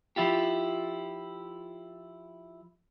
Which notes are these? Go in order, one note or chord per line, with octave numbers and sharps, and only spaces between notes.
F3 E4 F4 G4